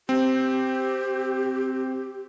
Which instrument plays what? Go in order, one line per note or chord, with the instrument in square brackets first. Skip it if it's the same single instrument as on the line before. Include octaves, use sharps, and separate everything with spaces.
[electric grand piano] C4 [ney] G4